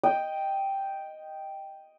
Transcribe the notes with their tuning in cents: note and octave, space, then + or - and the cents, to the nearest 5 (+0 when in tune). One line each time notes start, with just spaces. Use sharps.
D#5 +0 G5 +0